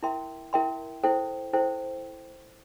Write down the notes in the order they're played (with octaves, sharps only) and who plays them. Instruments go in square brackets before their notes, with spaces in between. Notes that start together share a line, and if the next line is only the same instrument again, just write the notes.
[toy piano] E4 A#4 E5 G5 C6
E4 A#4 E5 G5 C6
E4 A4 C5 G5
E4 A4 C5 G5